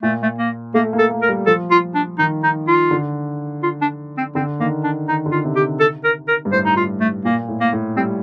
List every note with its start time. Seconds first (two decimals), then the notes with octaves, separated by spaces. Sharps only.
0.03 A#2 A3
0.23 A3
0.39 A#3
0.74 A3 A#3
0.93 A#3
0.99 A4
1.11 A#3
1.22 A#4
1.28 G3
1.46 F3 A4
1.71 F4
1.95 D4
2.19 D#3 D#4
2.43 D#4
2.68 F4
2.91 D3
3.63 F4
3.82 D4
4.18 C4
4.35 D3 C4
4.60 D#3 A#3
4.84 D4
5.08 D#3 D#4
5.26 D3
5.32 F4
5.44 C3
5.56 G4
5.80 A4
6.04 A#4
6.28 A#4
6.45 G2
6.52 A2 C5
6.65 D#4
6.77 F4
7.01 A3
7.25 A#2 A#3
7.48 A2
7.60 A#3
7.73 A2
7.96 G3 C4